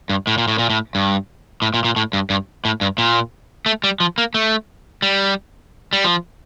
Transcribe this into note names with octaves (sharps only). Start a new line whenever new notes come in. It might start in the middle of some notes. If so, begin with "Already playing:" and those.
G2
A2
A#2
A2
A#2
A2
G2
A2
A#2
A#2
A2
G2
G2
A2
G2
A#2
A3
G3
F3
A#3
A3
G3
G3
F3